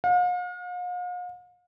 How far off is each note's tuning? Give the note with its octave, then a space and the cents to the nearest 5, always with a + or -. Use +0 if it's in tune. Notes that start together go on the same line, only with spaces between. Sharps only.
F5 +45